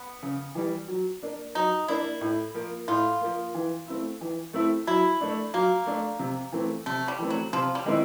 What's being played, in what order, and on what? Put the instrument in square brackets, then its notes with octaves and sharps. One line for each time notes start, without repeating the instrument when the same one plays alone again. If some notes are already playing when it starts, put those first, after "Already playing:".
Already playing: [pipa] B3
[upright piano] C#3
E3 G3
F#3
A#3 D4
[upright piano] F#3 [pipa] D#4
[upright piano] A#3 D4 [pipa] E4
[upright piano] A2
F3 A#3
[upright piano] A2 [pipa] F4
[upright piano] F3 A#3
E3
A3 C4 E4
E3
A3 C4 E4
[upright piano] F#3 [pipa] E4
[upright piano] A3 D4
[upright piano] F#3 [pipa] A#3
[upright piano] A3 D4
C3
E3 A3 C4
[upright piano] C3 [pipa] A3
[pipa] G3
[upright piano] E3 A3 C4
[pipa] F#3
[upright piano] C3 [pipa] F3
[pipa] G3
[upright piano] D#3 G#3 C4 E4